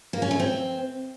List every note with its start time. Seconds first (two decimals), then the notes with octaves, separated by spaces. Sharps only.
0.13 A#3
0.22 C#4
0.31 A3
0.40 C4